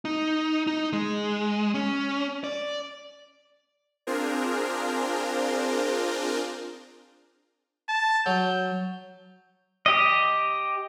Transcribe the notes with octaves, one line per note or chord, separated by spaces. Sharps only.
D#4
D#4
G#3
C#4
D5
C4 D4 F4 G#4 A#4 C5
A5
F#3 G6
G4 D#5